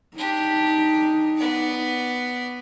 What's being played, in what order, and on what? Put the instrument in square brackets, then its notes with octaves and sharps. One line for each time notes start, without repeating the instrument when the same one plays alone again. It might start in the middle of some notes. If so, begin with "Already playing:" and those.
[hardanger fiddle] D4 G4 [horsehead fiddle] D#4
[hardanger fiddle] B3 D5